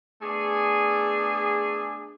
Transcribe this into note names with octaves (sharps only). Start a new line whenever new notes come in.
A3 B3 D4 G#4